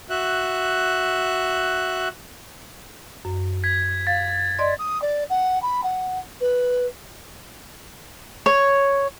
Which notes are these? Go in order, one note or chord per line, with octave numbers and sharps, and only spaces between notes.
F#4 E5 F#6
F#2
G#6 B6
F5 A6
D5 D#5 C6
D#6
D5
F#5
B5
F#5
B4
C#5